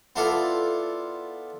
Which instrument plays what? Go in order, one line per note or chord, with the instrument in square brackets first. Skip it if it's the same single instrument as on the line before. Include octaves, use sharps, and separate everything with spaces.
[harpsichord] B3 E4 F4 A4 D5